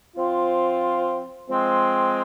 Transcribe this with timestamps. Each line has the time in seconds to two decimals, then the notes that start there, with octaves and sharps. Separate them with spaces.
0.15 F3 C4 F4
1.49 F3 G#3 C4